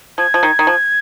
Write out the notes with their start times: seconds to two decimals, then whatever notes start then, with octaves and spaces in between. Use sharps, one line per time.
0.18 F3 G#6
0.34 F3
0.43 D#3
0.59 D#3
0.67 F3